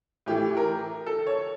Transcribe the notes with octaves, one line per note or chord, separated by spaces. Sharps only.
A2 E3 G4
A#4
A4
C#5